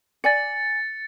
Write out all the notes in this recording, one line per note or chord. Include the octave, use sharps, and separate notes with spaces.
D5 G#5 A6 C#7